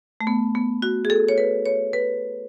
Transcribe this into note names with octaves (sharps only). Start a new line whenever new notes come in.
A3
B3
B3
F#4
G#4
A4
C#5
B4
C#5
B4